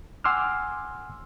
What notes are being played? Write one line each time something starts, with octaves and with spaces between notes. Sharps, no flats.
F#5 G#5 C6 D6 E6 F6